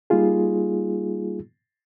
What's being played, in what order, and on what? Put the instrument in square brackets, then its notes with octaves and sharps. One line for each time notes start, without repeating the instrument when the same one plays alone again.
[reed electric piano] G3 A#3 D#4 F4 G#4